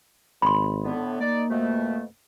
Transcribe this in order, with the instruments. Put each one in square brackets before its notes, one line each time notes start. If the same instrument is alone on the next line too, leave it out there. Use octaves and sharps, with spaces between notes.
[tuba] G#1 [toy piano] B5 C6
[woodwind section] A2 D3 B3
[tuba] A#3 [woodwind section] D#4 D5
[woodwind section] F2 B2 A3